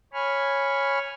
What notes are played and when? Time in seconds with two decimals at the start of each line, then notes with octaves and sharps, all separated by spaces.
0.13 C#5 G#5 B5 C#6 F6